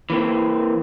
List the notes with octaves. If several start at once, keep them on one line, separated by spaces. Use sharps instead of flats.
E3 A#3 C4